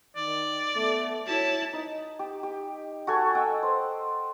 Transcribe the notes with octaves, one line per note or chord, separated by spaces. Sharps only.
D#3 D5
A3 B3
E4 F#4 C#5 A5
D#4
G4
G4
F#4 A4 G#5 C#6
D#5 F#5 G5 E6
C5